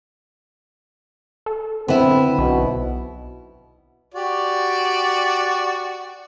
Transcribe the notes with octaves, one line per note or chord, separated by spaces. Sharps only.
A4
D3 B3 C4 E4
B1 B2
F#4 G4 D5